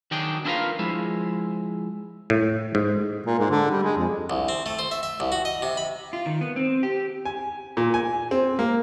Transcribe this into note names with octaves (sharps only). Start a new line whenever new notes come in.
D#3 F#3 D4 G#4 G5
D4 E4 F4 A#4 B4 F5
F3 G#3 E4
A2
G#2
A#2
G#2
D3
G3
G#3
F2
C2
C4
A3
C5
E5
E5
C2
F#4
D#5
C3
B5
F4
D#3
B3
C4
G4
G#5
A#2
G#5
C4
A#3